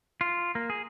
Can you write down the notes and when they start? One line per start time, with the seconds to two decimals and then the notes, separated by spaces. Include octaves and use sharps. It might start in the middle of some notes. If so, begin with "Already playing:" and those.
0.21 F4
0.55 A#3
0.70 G#4